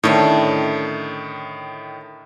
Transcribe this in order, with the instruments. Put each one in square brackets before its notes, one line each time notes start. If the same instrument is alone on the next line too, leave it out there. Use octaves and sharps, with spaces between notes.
[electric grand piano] A2 D#3 [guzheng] D3 A3 C#4